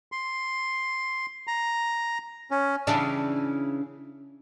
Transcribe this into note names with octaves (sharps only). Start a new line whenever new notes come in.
C6
A#5
C#4
C#3 E3 D4